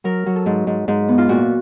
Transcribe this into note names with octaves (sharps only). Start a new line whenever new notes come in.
F#3 A#4
F#3
A4
G#2
G#2
G#2
B3
F4
A#2 F#4